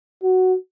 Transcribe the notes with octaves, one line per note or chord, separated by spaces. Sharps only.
F#4